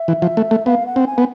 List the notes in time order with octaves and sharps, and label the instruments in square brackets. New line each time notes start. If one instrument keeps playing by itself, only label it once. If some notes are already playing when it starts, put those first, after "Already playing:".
Already playing: [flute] E5
[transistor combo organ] E3
F3
A3
A3
[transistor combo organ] B3 [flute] F5
[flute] F#5
[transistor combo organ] C4
[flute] G#5
[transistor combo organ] B3